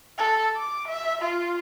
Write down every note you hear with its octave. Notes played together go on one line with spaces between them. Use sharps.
A4
D6
E5
F4